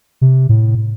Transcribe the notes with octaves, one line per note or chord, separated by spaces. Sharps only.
C3
A2